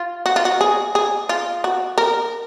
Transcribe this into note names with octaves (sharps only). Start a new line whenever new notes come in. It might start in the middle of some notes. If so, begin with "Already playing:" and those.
Already playing: F4
F#4
F4
F#4
G#4
G#4
F4
F#4
A#4